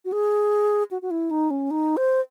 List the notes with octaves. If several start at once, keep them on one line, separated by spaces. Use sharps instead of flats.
F#4
G#4
F#4
F#4
E4
D#4
C#4
D#4
C5